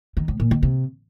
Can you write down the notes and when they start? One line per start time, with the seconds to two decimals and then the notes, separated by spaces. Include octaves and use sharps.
0.17 D#3
0.28 A2
0.40 A#2
0.51 D#3
0.63 C3